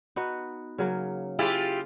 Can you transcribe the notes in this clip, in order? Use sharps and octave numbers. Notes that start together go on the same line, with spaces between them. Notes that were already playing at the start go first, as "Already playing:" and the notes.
B3 D#4 F#4
C#3 F#3 A#3
E4 F4 G4 G#4